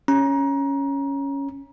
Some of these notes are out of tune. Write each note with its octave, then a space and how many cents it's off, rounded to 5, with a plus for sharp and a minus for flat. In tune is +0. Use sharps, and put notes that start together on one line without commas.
C#4 +0 A#5 +25